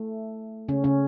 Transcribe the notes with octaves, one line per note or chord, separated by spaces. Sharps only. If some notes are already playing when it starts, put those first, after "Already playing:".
Already playing: A3
C#3 C#4
C#3 C#4